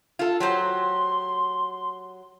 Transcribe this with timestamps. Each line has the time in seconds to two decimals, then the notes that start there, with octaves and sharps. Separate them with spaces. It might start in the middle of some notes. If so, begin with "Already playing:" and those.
0.19 F4 A4
0.40 F#3 G4 C5 C6